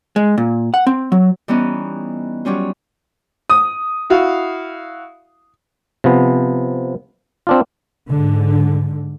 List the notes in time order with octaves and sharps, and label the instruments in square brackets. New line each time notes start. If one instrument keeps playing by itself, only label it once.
[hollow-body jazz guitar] G#3
A#2
F#5
C4
F#3
[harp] E3 G3 B3 C#4 D#4
F#3 G3 C#4 F4
[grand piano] D#6
[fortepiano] E4 F#4 F5
[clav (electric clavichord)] C3 F3 B3
C4 D4 F4
[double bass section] G#2 D3